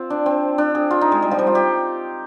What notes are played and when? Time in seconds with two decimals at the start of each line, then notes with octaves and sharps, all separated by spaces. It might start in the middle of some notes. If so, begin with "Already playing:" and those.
Already playing: C4 F4
0.10 D4
0.26 C4
0.58 D4
0.75 G#4
0.91 F4
1.01 D#4
1.12 G#3
1.22 G3
1.31 F3
1.39 G3
1.47 F4
1.55 G4